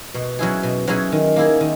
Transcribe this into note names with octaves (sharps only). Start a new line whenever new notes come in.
B2
F#3 C#4 E4 G#4
B2
F#3 C#4 E4 G#4
D#3
A#3 E4 G#4
D#3